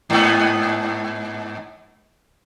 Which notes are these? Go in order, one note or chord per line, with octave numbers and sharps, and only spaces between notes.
G#2 B3